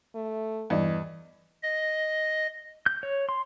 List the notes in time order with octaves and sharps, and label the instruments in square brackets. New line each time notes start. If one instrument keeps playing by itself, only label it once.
[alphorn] A3
[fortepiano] E2 [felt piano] G2 D5 D#5
[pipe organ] D#5
[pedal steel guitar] G6
C#5
C6